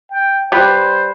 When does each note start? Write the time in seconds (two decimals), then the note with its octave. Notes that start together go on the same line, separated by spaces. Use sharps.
0.10 G5
0.52 G3 B4 C5